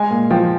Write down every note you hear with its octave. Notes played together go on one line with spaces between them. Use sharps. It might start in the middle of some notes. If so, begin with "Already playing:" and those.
Already playing: G#3 G#5
A#2
F3 G5